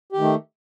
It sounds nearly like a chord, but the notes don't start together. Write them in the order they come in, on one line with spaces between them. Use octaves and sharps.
G4 D#3 A3